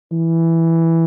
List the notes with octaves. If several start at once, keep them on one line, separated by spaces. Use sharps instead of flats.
E3